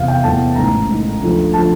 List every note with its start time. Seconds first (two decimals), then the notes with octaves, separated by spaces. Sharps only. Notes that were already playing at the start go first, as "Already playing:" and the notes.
Already playing: E2 C3 E3 F5
0.08 G5
0.23 E2 C3 E3 A5
0.55 A1 G#2 D#3 A#5
0.88 A1 G#2 D#3
1.20 D2 D3 F3
1.53 D3 F3 A5